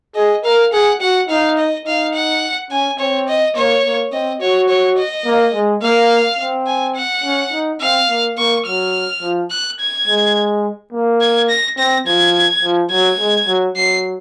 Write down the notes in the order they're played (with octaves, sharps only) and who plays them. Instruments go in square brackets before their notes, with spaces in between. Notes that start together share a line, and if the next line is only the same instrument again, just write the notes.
[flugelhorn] G#4 [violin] D#5
[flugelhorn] A#4 [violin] F5
[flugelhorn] G#4 [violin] F#5
[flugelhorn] F#4 [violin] F#5
[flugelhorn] D#4 [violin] F5
[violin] D#5
[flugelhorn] D#4 [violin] F5
[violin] F#5
[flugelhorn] C#4 [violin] G#5
[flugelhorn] C4 [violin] C#5
[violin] D#5
[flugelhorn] A#3 [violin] C#5
[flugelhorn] A#3
[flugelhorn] C4 [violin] D#5
[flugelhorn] F#4 [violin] C#5
[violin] C#5
D#5
[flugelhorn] A#3
G#3
[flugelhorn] A#3 [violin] F5
[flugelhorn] C4
[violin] G#5
F#5
[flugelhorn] C#4
D#4
[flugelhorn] C4 [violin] F5
[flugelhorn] A#3
[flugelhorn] A#3 [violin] C#6
[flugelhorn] F#3 [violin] F6
[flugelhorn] F3
[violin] F#6
G#6
[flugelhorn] G#3
A#3
[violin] G#6
A#6
[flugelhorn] C4 [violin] A#6
[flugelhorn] F3 [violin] G#6
[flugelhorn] F3
[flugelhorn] F#3 [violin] G#6
[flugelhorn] G#3
F#3
[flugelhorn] F#3 [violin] C7